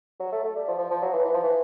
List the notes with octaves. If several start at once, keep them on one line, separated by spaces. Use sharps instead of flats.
F#3
A3
A3
G3
F3
F3
F3
F#3
E3
E3
F3
E3